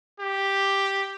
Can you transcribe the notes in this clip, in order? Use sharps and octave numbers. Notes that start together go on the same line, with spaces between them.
G4